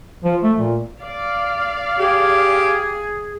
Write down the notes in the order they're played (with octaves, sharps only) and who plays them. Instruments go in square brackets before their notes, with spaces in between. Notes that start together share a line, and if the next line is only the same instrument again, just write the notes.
[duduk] F3
A3
A#2
[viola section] D5 F5
[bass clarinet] G4 [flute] G#4